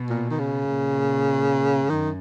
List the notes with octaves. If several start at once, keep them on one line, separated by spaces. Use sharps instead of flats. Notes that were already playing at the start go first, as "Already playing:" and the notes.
Already playing: B2
A#2
D#3
C#3
A#2
F#2 D#3